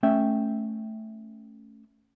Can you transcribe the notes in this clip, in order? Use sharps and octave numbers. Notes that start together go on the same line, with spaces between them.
A3 C#4 E5 G5